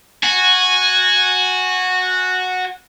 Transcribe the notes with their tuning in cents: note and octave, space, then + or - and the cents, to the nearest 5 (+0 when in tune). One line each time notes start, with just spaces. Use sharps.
F#4 -10 G#5 +0